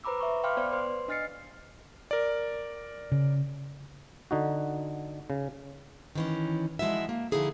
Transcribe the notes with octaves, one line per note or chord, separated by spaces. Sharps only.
B4 C5 A#5 B5 D6 E6
B4 E5 C#6
F5 G5 B5 C6 D6 F6
B3 C5 D5
B4 C5 C6
D4 D#5 F6 A6 C7 C#7
A#4 D5
C#3
D3 D#4 F#4
C#3
D#3 E3 C#4
F3 G#3 E4 F#4 E5
A#3
D3 F3 D#4 E4 G#4 A4